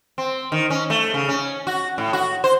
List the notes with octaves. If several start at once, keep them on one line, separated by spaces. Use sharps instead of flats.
C4
D#3
C#4
A3
C#3
C#4
F#4
A2
F#4
C5